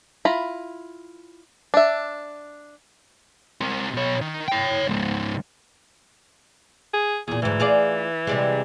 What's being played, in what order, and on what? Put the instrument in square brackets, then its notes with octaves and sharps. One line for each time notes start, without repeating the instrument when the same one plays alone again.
[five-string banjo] E4 F4 A#5 B5
D4 E5
[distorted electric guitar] C3 A#4
B2 C#5
D#3
C#5 G5
C#2 G#2
[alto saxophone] G#4
[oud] E2 A#2 [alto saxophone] G#4
[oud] D2 G#2 [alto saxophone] E3
[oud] F4 G#4 D5
C3 G3 G#3